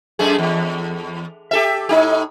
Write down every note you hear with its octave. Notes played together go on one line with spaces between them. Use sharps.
F#2 A3 G#4
E2
G4 A4 E5
A2 D#4 G4